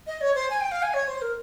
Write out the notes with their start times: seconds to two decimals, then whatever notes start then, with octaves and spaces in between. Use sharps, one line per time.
0.07 D#5
0.21 C#5
0.35 C5
0.50 G#5
0.61 G5
0.72 F5
0.82 G#5
0.94 C#5
1.08 C5
1.22 A#4